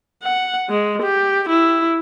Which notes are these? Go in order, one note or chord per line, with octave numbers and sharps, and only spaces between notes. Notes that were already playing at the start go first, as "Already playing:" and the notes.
F#5
G#3
G4
E4